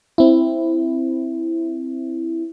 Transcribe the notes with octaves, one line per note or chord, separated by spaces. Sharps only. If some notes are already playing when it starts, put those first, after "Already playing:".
C4 E4